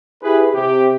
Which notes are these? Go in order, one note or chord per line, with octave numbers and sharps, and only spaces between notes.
E4 G4 G#4 B4
C3 G4